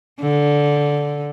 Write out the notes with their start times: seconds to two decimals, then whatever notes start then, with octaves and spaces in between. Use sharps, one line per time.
0.21 D3